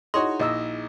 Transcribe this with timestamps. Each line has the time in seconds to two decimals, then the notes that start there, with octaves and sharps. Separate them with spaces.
0.14 D#4 E4 F#4 G#4 C#5 D#5 C6
0.40 A#1 A#4 D#5 E6